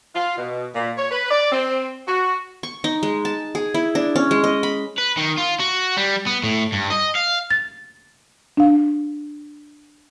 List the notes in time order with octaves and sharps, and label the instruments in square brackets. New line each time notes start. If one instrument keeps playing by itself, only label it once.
[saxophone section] F4
B2
A#2
C#5
B4
D5
C4
F#4
[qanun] C#6
D#4
G#3
A5
G#4
E4
D4
C#4
G#3
D#5
B5
[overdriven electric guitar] B4
D#3
F4
F#4
G3
B3
A2
G2
D#5
F5
[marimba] A6
D4 F5